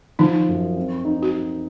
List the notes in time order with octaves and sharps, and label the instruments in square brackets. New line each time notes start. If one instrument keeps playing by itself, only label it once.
[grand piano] F3 [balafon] D#4
[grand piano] F#2
C4
D#4
[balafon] F#4